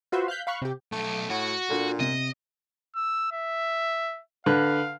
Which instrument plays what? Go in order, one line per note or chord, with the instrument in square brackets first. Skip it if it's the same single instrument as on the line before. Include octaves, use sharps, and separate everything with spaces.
[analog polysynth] F4 F#4 B4 C5 E5
F5 F#6 G6 B6
F5 B5 C#6 F#6
C3 G4
[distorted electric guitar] B1 [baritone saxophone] A3
[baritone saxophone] A2 [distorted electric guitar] F#4
[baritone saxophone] A#2 [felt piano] D4 F4 A4
[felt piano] C3 [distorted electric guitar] D#5
[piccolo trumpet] E6
E5
[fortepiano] D3 B4 [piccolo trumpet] F5